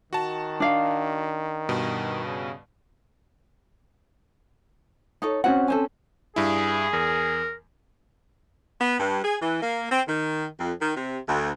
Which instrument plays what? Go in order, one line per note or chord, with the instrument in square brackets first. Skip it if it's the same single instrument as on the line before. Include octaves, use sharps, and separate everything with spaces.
[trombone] D#3 [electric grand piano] F#4 A5
[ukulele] D4 F5
[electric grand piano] G2 B2
[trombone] C#3
[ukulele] D#4 A4 C#5
[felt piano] C4 C#4 [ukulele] F#4 F#5
[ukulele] A4 C5 G#5
[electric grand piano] G2 E4 [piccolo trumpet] G#4
[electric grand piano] E2 [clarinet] A#4
[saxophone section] B3
G2
G#4
E3
A#3
C4
D#3
F2
D#3
C3
D2